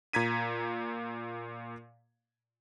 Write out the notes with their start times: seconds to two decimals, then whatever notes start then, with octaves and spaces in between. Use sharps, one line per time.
0.13 A#2 A#5 G#6 B6 D#7